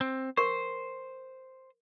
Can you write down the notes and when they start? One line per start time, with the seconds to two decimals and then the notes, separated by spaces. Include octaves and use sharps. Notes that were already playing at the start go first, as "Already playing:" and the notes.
0.01 C4
0.37 A#4 C5 C#6